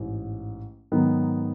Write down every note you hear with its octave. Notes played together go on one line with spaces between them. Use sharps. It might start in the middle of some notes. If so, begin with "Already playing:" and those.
Already playing: A1 G#2
G#2 D#3 F#3 B3 D#4